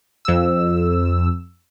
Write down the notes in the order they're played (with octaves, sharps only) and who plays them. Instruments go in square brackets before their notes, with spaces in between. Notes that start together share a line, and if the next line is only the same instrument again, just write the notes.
[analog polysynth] F2 E6